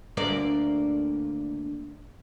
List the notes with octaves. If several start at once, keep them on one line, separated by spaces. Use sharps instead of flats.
D2 A#3 D5